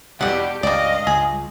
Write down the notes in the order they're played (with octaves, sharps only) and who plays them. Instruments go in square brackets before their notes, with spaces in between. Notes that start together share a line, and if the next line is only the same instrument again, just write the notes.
[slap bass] E2 B2 [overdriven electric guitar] G2 [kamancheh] G4 [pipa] D5 F#5
[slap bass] C#2 [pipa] G3 D5 [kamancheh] D#5 F5
[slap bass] C#2 [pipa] G#4